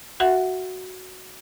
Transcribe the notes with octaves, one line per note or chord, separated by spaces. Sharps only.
F#4 E5 F#5